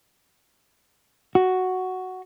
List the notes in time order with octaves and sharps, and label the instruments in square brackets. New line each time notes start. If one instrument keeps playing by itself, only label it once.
[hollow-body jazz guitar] F#4